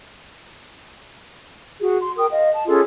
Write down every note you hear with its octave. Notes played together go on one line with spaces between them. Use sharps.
F#4 G#4
C6
A#4 G5 D#6
D#5 F5
A5
C#4 F4 G#4 A4